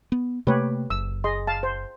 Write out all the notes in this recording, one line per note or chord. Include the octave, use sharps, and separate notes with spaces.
B3
C3 A3 A#3 G4 B4 C#5
F#1 E6
G#4 D#5 C6
F5 A5
C5